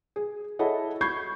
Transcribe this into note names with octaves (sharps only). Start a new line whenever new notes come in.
G#4
E4 G#4 A4 C#5 D#5 F#5
B5 C#6 G6 G#6 C7